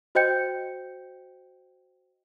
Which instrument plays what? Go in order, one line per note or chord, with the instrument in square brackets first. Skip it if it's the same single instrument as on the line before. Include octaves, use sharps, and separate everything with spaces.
[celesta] F#4 C5 D#5 G5 G6 C#7